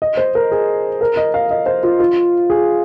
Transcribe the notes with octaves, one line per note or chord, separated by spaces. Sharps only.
D#5
C5
A#4
G#4
A#4
D#5
F5
D#5
C5
F4
F4
G#4